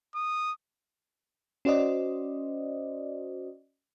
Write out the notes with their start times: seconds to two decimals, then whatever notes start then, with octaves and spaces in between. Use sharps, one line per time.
0.15 D#6
1.65 C#4 F#4 C5 D5 D#5